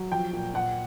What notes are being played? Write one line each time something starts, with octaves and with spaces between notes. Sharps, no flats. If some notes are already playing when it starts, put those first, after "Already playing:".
Already playing: F#3
F3 G5
A#2
A#2 F#5